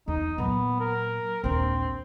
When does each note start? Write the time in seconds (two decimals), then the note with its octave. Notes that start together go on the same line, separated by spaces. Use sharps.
0.08 E2 D#4
0.38 A#2 F#3 B3
0.80 A#4
1.44 A#1 D#2 C4